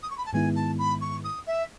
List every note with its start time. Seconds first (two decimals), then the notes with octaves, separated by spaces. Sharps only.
0.02 D#6
0.10 C#6
0.17 B5
0.25 A5
0.33 G#2 D#3 G#3 B3 E4 G#5
0.55 A5
0.78 B5
1.01 C#6
1.24 D#6
1.47 E5